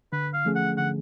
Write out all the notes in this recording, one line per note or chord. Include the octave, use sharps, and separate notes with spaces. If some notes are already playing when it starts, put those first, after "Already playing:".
D3 B4
F5
F3 A3 C#4 G#4
F#5
D3 F#5